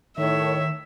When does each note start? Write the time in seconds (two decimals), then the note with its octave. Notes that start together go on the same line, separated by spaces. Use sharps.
0.18 A2 D#3 C#5 E5